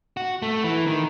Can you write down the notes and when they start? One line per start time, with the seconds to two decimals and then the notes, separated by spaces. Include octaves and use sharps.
0.17 F#4
0.42 A3
0.64 E3
0.86 D#3